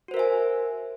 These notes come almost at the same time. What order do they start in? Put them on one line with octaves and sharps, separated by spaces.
F#4 C5 A#4 E5 G#5